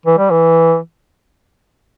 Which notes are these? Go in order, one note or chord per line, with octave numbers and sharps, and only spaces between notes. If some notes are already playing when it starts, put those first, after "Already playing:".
E3
G3
E3